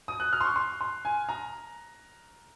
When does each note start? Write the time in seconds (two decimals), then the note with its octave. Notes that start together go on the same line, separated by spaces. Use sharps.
0.08 D#6
0.20 F#6
0.33 F6
0.41 C6
0.45 C#6
0.56 C6
0.81 C6
1.05 G#5
1.29 A#5